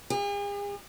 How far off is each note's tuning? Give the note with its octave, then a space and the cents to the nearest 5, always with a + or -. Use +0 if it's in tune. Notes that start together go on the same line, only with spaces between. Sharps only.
G#4 -45